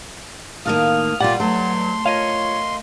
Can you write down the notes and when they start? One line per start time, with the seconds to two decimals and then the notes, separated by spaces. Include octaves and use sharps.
0.66 A2 D#3 A#3 F5 D#6 F6
1.21 A#2 G3 F4 G4 D5 F#5
1.40 G2 F#3 A3 C6
2.06 F4 A#4 C#5 D#5 F5 C6